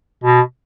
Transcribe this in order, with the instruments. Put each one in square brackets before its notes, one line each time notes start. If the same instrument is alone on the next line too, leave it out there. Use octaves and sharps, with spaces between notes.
[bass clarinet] B2